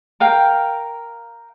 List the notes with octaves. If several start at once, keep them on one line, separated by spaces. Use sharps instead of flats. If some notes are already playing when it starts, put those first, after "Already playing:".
A#4 F5 G5